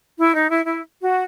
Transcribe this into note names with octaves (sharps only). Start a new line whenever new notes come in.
E4
D#4
E4
E4
F#4